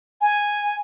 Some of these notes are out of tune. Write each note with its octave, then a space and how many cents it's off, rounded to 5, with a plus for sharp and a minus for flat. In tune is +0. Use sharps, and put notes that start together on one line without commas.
G#5 -5